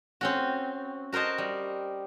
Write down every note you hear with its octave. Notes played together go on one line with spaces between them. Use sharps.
C4 C#4 F#4
F#4 A#4 C5 D#5 A5
G3